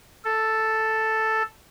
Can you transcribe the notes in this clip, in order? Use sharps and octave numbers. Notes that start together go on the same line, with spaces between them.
A4